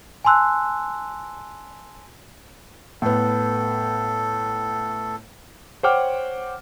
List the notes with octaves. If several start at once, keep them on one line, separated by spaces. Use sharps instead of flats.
G#5 A5 C6 E6 F#6
A2 B3 A4
C5 C#5 F#5 G5 D6 F6